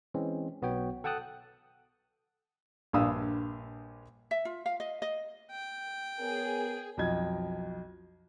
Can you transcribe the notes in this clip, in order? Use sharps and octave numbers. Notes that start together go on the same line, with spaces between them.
E3 G#3 C4 C#4
B1 B3 F#4 C#5 G5
A4 F#5 G5 A5 D#6 F#6
A#1 G2 F5 D#6 E6
E5
F4
F5
D#5
D#5
G5
B3 G#4 A#4 C#5
B1 F2 D#5 G#6